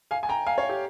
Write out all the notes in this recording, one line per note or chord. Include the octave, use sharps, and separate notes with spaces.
F5 G#5
G#5
G5 A#5
F5 G#5
C#5 F5
G4